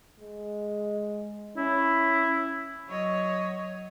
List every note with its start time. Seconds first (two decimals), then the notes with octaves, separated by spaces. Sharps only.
0.20 G#3
1.57 C#4 E4
2.87 F#3 C#5 D#5